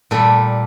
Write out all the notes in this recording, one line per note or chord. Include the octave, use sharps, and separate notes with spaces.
A#2 G3 A4